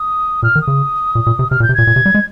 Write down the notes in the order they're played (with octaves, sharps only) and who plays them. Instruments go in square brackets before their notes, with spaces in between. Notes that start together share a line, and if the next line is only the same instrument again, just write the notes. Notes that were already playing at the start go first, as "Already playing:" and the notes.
Already playing: [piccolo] D#6
[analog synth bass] A#2 [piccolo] F6
[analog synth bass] D#3
[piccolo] D#6
[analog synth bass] C#3
A#2
A#2
C3
[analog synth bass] C3 [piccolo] F6
[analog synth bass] A#2
[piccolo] G6
[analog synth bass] C3
[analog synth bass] A#2 [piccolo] G#6
[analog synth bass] A#2
C3
G3
G#3